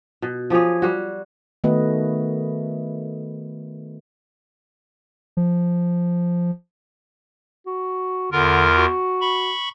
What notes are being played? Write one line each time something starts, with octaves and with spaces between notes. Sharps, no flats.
B2
F3 G4 G#4 C#5
G3 F#4
D#3 A3 B3 F#4 B4 D#5
F3
F#4
E2 D3 F4 A#4
F#4
B5 C#6